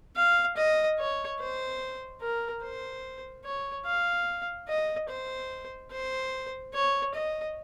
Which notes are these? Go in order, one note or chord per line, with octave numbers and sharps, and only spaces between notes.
F5
D#5
C#5
C5
A#4
C5
C#5
F5
D#5
C5
C5
C#5
D#5